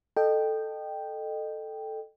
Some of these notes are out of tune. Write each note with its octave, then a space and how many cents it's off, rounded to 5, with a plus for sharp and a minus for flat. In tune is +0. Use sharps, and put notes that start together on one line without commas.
A4 +0 D#5 -25 G5 +0